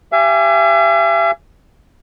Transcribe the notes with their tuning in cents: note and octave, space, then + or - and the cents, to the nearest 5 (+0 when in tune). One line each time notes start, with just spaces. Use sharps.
G4 +0 E5 +45 G#5 +0